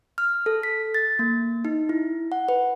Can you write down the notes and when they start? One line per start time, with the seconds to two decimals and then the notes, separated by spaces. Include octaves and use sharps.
0.18 F6
0.46 A4
0.63 B6
0.94 A6
1.19 A#3
1.65 D#4
1.89 E4
2.32 F#5
2.49 B4